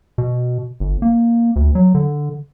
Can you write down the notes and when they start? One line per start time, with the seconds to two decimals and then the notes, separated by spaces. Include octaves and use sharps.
0.18 B2
0.80 G1
1.02 A#3
1.56 D2
1.75 F#3
1.95 D3